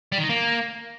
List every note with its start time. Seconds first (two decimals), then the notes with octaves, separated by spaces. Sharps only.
0.12 G3
0.18 D#3
0.24 D#4
0.29 A#3